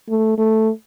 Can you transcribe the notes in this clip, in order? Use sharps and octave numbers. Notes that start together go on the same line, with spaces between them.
A3
A3